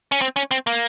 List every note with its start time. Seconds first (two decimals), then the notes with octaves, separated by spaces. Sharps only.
0.12 C#4
0.21 C4
0.36 C#4
0.51 C4
0.67 A#3